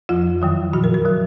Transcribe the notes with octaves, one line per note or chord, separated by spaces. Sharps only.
F2 F3 F4
F#2 D#3 F#3
A#2 F3 F#4
A#4
A#4
D#3 F#3